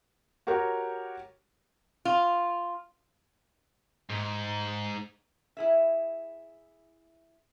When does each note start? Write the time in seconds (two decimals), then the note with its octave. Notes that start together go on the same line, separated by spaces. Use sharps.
0.47 F#4 G4 A#4 C#5 F#5
2.05 F4
4.10 G#2
5.57 E4 G#4 E5